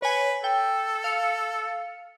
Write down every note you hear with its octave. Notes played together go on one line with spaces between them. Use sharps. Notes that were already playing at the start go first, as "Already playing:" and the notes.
B4 C#5 G#5
A4 G5
F5 C#7